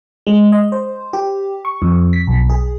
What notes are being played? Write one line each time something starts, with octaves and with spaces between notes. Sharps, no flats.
G#3
D#5
C5
G4
C#6
F2
B6
B1
G#4